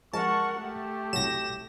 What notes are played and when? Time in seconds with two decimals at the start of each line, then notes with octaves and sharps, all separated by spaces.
0.13 F3 G#3 A#4 F#5 A5 C#6
0.59 A3 G4
1.13 C2 F#3 A#6 E7